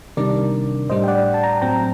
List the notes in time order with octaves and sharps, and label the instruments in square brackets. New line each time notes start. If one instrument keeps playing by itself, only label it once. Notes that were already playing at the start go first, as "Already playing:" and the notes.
[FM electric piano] C3 D#3 G3 D4 A#4 D5
A2 G3 D4 C5 D#5
G5
D5 F#5
A5
G5 A#5
A2 F#3 C4 G5 A#5